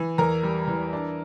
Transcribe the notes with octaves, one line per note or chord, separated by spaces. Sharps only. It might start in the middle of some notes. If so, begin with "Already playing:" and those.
Already playing: E3
E2 A#4 A#5
G3
E3
D4